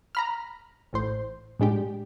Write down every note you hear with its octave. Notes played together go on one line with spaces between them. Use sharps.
A#5 B5 F6
A1 A2 C5
A2 G#3 D4 G4